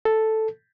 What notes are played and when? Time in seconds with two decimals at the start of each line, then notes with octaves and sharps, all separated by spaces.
0.05 A4